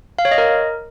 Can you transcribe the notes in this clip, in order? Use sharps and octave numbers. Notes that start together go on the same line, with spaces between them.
F5
C#5
D#5
A#4